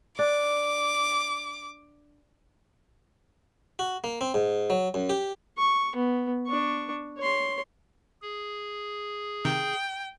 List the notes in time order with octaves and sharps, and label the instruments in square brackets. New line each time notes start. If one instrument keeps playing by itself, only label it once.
[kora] D4 [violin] D6
[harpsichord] F#4
A#3
C4
G#2
F#3
F#2
G4
[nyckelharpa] C#6
B3
D4 C#6
C#5 C6
[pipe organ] G#4
[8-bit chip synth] C3 D#3 [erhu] G5